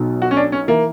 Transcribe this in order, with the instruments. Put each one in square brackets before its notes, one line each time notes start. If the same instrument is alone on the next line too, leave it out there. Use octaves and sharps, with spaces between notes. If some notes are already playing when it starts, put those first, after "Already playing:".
Already playing: [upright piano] B1 B2 F#3
[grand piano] F#4
C#4
D4
C#4
[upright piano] E3 [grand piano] A#3